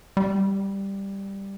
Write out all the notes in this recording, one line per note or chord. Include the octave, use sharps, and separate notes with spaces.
G3